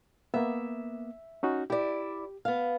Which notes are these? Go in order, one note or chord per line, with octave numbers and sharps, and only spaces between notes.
A#3 B3 E5
C#4 D#4 F#4
E4 G4 D5
B3 F5